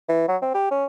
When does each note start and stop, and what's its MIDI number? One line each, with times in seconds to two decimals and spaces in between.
0.09 0.27 52
0.28 0.36 54
0.42 0.53 60
0.54 0.67 67
0.71 0.85 61